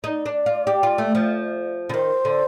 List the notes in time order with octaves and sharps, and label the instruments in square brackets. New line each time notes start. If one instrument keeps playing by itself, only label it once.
[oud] D#4 [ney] D5
[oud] D4
F4
G4
F4
A3
F3
D3
[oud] D#3 [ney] C5
[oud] D3